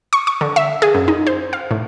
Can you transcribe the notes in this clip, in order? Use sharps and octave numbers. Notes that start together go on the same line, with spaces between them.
C#6
C#6
D3
E5
G#4
F#2
D#4
C5
F5
A2